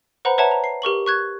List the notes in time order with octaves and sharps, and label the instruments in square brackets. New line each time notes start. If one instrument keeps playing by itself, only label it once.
[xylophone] B4 C5 F#5 A#5 B5
B4 C#5 E5 F#5 A5 A#5
A#5
C7
G4 A#4 C#6 F#7
C#6 F#6 G#6